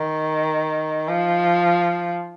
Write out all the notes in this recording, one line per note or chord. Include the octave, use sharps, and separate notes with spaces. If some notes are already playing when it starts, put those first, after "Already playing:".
Already playing: D#3
F3